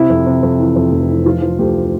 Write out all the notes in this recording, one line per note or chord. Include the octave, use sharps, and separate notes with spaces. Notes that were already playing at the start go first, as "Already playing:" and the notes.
Already playing: C3 E4
F2
C3
F2
E3
F2
F1
E3
F3 F4
F3
D2 G4